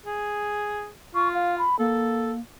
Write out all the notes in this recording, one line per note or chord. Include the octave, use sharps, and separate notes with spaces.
G#4
F4 C#6
F5
B5
A#3 A4